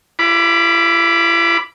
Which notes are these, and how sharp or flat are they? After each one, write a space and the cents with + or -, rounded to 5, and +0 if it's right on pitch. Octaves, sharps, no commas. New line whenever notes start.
E4 +40 B5 -5 D6 +0